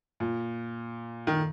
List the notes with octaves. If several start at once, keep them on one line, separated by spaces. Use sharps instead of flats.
A#2
D#3